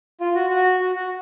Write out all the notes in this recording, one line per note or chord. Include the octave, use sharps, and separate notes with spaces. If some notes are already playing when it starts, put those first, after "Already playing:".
F4
F#4
F#4
F#4
F#4